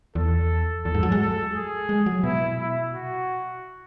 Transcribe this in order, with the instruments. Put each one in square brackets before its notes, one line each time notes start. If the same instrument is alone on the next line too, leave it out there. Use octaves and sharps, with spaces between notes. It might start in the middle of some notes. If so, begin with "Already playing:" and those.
[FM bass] E2 [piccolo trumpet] A4
[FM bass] E2 [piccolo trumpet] A4
[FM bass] G#2
F#3
G#3
[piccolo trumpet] A4
G#4
[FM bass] G#3
F#3
[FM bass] B2 [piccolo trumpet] E4
[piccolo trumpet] E4
F#4